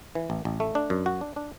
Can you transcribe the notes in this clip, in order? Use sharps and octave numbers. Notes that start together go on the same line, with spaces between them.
E3
A1
A1
A3
D4
F#2
F#4
D4
D4